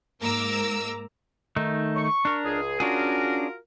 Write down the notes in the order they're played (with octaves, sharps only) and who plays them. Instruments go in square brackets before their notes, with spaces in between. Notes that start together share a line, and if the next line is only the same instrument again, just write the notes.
[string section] G#2 A#3 A#4 A#5 D6 E6
[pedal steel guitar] D#3 A3 D#4
[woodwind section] C#6
[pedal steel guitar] D4 A#4
[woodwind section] C#2 G#4
[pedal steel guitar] C#4 D4 G#4 [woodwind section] F4 F#4 A#4